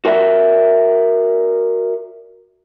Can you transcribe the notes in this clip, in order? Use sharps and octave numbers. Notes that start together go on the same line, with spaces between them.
F#4 A#4 D5 E5